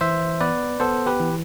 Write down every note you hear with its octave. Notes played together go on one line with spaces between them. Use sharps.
E3 C5 E5
B3 B4 D5
B3 A4 C5
G4 B4
E3